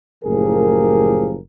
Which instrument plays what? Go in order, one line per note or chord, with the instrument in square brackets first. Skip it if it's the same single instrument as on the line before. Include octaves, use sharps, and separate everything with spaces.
[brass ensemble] F#1 A2 F3 G4 G#4 A#4